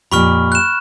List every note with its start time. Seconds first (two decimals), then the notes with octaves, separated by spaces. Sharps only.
0.12 F2 A#2 G4 B5 C#6 F6
0.52 F#6 E7